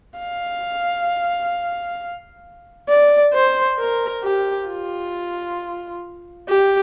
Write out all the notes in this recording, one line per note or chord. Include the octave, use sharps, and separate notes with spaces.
F5
D5
C5
A#4
G4
F4
G4